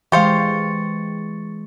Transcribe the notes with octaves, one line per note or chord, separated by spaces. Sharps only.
E3 G#3 G4 C5 F5 C#6 A6 C#7